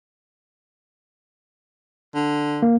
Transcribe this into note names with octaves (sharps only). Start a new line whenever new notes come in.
D3
A#3